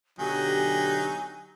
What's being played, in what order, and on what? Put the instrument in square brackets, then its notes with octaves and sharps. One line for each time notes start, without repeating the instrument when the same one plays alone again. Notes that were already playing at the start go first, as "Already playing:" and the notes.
[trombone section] B1 D3 G4 [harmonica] F#3 D#4 [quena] G#5